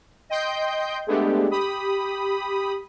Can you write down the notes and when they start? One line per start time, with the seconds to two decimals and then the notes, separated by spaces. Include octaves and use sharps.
0.29 D#5 G5 C6 G6
1.07 G#3 A3 B3 D4 G4
1.51 G4 B5 D#6